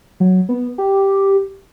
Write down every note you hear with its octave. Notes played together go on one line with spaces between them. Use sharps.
F#3
B3
G4